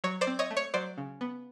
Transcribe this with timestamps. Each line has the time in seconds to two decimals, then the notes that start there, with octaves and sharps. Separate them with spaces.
0.04 F#3 C#5
0.21 C5 D5
0.27 C4
0.39 C#5 D#5
0.51 A3
0.57 C#5
0.74 F#3 C5 D5
0.98 C#3
1.21 B3